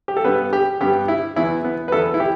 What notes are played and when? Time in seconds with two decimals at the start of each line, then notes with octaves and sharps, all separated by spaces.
0.08 G4
0.17 A4
0.24 G2 G3 B3 B4
0.53 G4
0.81 G2 G3 B3 G4
1.08 E4
1.36 E2 E3 B3 E4
1.64 B3
1.88 B4
1.92 E2 E3 B3 A4
2.14 E4
2.20 G4